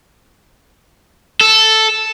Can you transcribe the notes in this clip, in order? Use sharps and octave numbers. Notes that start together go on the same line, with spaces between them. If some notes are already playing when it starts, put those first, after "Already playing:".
A4